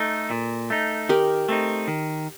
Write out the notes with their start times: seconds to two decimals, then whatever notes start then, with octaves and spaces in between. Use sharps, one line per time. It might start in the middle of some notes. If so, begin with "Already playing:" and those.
Already playing: A3 D#4 A4
0.31 A#2
0.70 A3 D#4
1.09 D#3 G4 A#4
1.49 A3 C4 D#4
1.88 D#3